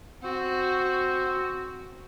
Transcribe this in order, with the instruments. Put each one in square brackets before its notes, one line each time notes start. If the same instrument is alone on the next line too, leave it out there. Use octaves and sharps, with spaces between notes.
[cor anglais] C4 [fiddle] F#4